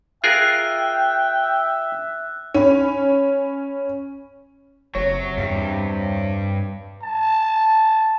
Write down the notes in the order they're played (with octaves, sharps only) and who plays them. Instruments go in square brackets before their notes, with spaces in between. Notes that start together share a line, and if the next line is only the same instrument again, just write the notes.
[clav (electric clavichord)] F4 G#4 A#4 [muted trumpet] E5 [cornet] G5 [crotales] F#6
[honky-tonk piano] C#4 B5
[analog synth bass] F#1 [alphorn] C3 [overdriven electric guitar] F#3 [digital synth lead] C#5
[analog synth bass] E2 [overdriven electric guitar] G2
[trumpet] A5